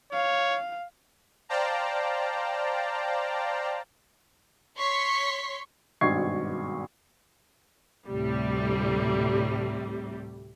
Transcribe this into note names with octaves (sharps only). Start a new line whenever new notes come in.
C#5 F5
C5 D5 F5 G5 A5 A#5
C#5 C6 C#6 B6
G#1 G2 B2 C#6 G#6 C7
D2 A2 C3 G3